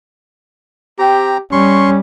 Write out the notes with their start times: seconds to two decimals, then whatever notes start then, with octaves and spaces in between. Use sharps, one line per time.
0.99 C4 G4 A#5
1.52 G3 C#4 C6 C#6